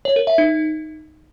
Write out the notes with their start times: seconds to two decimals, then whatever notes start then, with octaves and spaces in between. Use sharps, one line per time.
0.05 C#5
0.16 A#4
0.27 E5
0.38 D#4